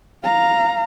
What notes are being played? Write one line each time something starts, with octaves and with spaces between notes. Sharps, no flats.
F5 A#5